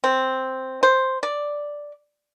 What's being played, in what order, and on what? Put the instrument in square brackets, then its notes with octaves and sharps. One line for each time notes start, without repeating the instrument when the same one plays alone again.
[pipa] C4
C5
D5